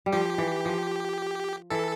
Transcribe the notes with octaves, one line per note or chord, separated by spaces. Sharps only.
G3
F3 G4
E3
F3
E3 A4